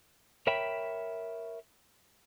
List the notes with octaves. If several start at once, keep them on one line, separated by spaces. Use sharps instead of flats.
A#4 C#5 E5 G5 B5